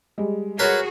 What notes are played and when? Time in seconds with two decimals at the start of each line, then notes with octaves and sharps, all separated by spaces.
0.18 G3 G#3
0.59 F#4 G#4 A#4 B4 C#5 C6